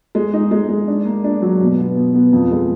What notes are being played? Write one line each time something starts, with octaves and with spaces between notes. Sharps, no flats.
G#3
D#4
G#3
G#3
D4
A#3
D4
F#3
B2
B3
B2
B3
F2
G#3